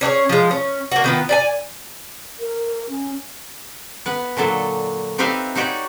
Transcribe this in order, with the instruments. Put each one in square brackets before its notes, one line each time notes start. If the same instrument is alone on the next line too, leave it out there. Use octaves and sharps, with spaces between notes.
[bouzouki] C#4 D4 G#4 C#5
F3 G#3
C#4
A#3 F#4
D#3 B3 F4
D5 E5 G#5
[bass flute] A#4
C#4
[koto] B3 B4
A#2 D3 F#3 A4
C4 D#4 G4 B4 E5 F5
D#4 F#4 G4 C#5 D5